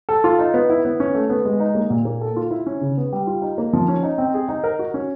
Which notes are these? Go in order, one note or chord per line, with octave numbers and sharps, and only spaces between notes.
A4
F4
D#4
B3
E4
B3
C#4
A3
B3
G#3
D#4
A#3
A#2
A#3
A4
F4
E4
C#4
C#3
B3
G3
F4
D#4
A#3
F3
C#4
D#4
C4
G#4
D#4
A#4
F#4
C#4